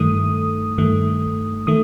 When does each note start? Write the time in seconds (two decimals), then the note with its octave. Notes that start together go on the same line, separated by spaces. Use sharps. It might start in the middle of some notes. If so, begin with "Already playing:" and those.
Already playing: G2 D#3 A3 D#6
0.78 G2 D#3 A3
1.67 D#3 A3 D#6